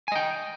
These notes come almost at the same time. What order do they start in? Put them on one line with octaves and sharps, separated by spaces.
G#5 D#5 G5